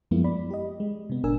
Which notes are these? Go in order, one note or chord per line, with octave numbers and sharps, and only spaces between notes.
F#2 F3 G#3 A#3 B3 E4
D5 B5
G4 D#5
G#3
C3 B3
G1 A#2 D4 A#4 G#5 E6